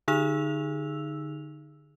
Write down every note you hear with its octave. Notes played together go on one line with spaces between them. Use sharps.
D3 D#4 G#4 E6 F7